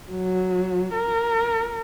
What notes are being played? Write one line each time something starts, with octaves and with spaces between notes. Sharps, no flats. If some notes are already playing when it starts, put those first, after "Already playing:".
F#3
A#4